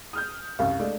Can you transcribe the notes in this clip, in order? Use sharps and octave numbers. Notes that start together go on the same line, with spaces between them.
D#6 F6 G6
C2 F#2 F5 C#6
G#3 A3 D4